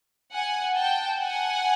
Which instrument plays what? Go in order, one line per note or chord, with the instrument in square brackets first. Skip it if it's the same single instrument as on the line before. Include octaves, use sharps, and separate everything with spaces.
[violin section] F#5 G#5
G5 A5
F#5 G#5